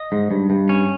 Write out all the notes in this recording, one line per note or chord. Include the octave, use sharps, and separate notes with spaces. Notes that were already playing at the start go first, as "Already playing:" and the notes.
Already playing: D#5
G#2
G2
G2
C#4